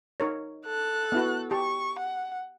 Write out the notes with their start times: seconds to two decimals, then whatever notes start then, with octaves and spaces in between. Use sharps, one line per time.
0.20 D#4 A#4 C#5
0.66 A4 F#6
1.12 B3 E4 F#4
1.51 G4 A5 C#6
2.00 F#5